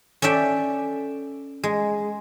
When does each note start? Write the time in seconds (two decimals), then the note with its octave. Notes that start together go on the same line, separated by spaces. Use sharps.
0.22 C#4 A4 D5 E5 G5
1.64 G#3